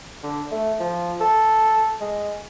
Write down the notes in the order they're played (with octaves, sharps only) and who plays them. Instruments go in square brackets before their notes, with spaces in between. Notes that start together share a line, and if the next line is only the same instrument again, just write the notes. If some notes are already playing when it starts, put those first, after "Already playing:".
[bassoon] D3
A3
F3
A4
G#3